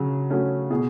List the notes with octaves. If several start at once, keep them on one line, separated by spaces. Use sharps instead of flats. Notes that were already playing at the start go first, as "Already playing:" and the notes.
Already playing: C#3 F#3
F#3 A3 C#4
B2 G#4